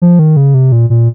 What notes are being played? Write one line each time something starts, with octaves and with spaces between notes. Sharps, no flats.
F3
D#3
C#3
C3
A#2
A#2